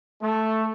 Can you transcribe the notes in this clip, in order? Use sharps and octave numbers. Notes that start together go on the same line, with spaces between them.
A3